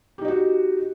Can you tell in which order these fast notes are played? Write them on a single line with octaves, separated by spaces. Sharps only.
G4 D#4 D#5 F#4